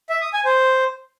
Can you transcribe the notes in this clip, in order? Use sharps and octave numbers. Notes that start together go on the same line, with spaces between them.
E5
D#6
G#5
C5